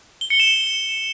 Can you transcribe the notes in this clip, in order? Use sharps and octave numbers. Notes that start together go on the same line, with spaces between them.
G7
C#7
E7